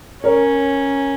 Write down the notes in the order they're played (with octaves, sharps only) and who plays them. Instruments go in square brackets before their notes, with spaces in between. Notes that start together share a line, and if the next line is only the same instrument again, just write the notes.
[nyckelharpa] C#4 [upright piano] A#4 C#5